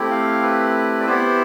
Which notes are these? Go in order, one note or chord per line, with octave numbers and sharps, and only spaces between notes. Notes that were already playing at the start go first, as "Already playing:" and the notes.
Already playing: A3 C4 E4 G4
F5
B4
D5
B3 E4 G4 C5